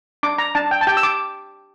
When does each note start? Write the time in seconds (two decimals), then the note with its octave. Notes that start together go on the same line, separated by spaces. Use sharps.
0.23 D4 D6
0.38 A#5
0.55 D4 A5
0.71 G5
0.81 A5
0.87 G4 G5
0.97 E6
1.03 D6